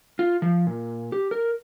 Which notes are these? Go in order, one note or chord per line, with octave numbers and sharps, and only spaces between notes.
F4
F3
A#2
G4
A#4